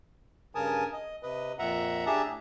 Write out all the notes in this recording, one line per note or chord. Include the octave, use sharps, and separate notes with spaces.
G2 C#3 A#4 G#5 A5 D#6
D#5
C3 B4 D#5
F2 A#2 E5 F#5 A#5
D4 G4 G#4 E5 A5 A#5
A2